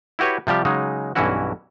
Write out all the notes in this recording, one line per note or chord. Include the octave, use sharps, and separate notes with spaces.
E4 F#4 G4 B4 C#5
C3 F3 G3 G4
C#3 F#3 G#3 D#4
B1 G2 E3 C#4 E4 F#4